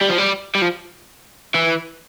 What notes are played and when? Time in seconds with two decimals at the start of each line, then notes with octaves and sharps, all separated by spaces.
0.01 G3
0.09 F3
0.18 G3
0.55 G3
0.62 F3
1.55 E3